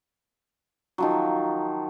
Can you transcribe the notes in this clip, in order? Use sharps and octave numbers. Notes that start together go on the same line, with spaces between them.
D#3 F3 F#3